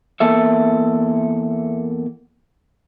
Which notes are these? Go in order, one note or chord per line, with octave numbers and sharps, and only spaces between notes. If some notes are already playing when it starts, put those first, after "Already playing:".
E2 A#3 A4 E5